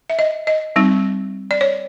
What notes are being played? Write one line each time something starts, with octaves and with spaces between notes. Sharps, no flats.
E5
D#5
D#5
G3 C4 D#4
D5
C#5